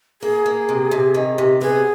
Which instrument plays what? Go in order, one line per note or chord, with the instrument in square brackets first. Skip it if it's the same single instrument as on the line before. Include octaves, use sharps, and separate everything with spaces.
[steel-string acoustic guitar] A#3 [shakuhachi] G#4
[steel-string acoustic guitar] A#3
C3
C3
D#3
C3
[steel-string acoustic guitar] B3 [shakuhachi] G#4